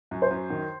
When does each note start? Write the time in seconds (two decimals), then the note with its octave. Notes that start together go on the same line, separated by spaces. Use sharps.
0.11 F#2
0.22 C5
0.31 F#2
0.50 D#3